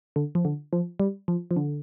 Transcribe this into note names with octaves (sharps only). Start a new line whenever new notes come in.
D3
F3
D3
F3
G3
F3
F3
D3